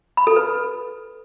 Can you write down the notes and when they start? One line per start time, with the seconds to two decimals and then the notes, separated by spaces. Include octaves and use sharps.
0.17 B5
0.27 A4
0.36 B4